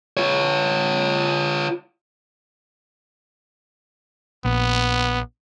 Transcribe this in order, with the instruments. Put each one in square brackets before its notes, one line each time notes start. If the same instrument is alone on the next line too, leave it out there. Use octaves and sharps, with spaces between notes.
[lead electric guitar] F4 C#5
[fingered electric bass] A#1 [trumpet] B3